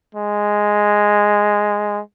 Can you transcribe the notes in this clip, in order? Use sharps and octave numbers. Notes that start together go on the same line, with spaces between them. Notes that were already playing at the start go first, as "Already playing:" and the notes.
G#3